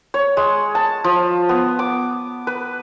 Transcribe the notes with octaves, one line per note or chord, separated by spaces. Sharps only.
C#5
G#3
A5
F3
B3
D6
B4